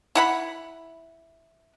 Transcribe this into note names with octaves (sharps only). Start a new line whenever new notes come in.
E4 F#5 B5